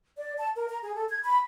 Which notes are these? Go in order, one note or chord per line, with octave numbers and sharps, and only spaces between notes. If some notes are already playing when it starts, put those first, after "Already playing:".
D5
A5
A#4
A#5
G#4
A4
G#6
B5